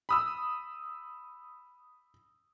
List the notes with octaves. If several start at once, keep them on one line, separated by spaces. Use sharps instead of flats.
B5 D#6 E6